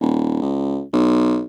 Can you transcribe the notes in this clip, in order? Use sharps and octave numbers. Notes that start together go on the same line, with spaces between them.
D#1
C#2
B1